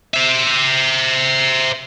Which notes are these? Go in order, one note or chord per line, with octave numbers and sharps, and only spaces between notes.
C5 E5